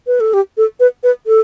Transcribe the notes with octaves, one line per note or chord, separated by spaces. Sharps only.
B4
A4
G4
A4
B4
B4
A4